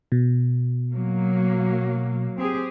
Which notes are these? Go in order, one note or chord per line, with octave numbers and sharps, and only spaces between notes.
B2
F#3 A#3
C4 G4 G#4